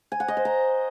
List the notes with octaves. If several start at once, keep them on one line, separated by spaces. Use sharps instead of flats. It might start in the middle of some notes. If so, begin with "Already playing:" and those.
G#5
F#5
D#5
C5
A#5